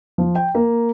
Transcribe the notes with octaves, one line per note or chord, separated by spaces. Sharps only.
F3
G5
A#3